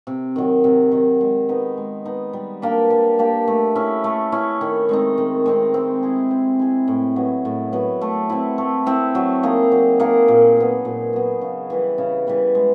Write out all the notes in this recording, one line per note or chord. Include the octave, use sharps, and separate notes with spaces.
C3
D#3 F#3
C3
D#3 F#3
G#3
B3 D#4
G#3
B3 D#4
G3
A#3 D4 G4
G3
A#3 D4 G4
A3
C#4 E4
A3
C#4 E4
D#3
G#3 C4 D#4
D#3
G#3 C4 D#4
C4
E4 G#4
C4
E4 G#4
A2
F#3 B3
A2
F#3 B3
A3
C4 E4
A3
C4 E4
F#3
A#3 D#4 G#4
F#3
A#3 D#4 G#4
A#2
F#3 B3
A#2
F#3 B3
C#3
E3 G3 B3
C#3
E3 G3 B3
G#3